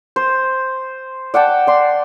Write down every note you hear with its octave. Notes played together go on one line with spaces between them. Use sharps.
C5
D5 F#5 G5 A5
D5 C6